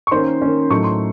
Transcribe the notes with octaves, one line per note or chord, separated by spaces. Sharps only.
C#6
D#3 A#3 C#4 C5 C6
D#3 A#3 C#4
A2 F#3 A3 D#4 C#6
C6